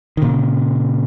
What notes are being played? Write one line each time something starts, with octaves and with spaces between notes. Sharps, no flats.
D#3
A#2 C#3